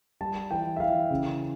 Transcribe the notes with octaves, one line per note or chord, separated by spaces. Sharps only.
G3 A5
E3 G5
E5
E3 F5
C#3